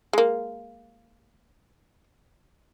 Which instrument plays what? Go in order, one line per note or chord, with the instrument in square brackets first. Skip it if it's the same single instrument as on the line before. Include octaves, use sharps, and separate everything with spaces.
[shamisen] G#3 A#3